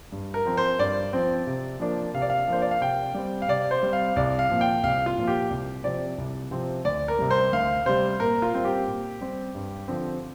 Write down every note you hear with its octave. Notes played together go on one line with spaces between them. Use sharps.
G2
A#4
F3 C4
C5
G2 D5
F3 C4
C3
F3 A#3 D4
C3 F5
D5
F5
F3 A#3 D4 C5
D5
F5
C3 G5
G3 C4
F5
C3 D5
C5
G3 C4
F5
C2 D5
F5
A#2 F3
G5
C2 F5
F4
A#2 F3
G4
C2
C3 F3 C4 D5
C2
C3 F3 C4
D2 D5
A#4
C3 G3
C5
D2 F5
C3 G3 C5
A#2 A#4
F4
G3 C4
G4
A#2
G3 C4
G2
D3 F3 C4